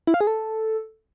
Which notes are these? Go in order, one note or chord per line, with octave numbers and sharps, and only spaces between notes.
E4
F5
G#4
A4